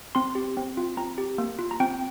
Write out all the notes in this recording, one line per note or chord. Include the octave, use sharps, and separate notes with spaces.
C4 C6
G4
C4
F4
C4 A#5
G4
A#3
F4
A#5
C4 G5